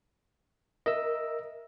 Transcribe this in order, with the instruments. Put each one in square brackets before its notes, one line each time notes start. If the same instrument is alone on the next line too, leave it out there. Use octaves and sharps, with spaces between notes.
[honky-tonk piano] A#4 [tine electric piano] D#5 E5 E6